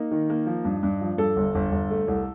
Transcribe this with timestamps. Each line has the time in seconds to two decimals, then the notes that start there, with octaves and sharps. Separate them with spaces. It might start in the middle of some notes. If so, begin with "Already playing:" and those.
Already playing: A#3 D#4
0.11 D#3
0.30 A#3
0.46 F3
0.65 G2
0.83 G2
1.01 F3
1.18 G2 A4
1.36 G1
1.55 G1
1.72 G1
1.90 A3
2.08 C2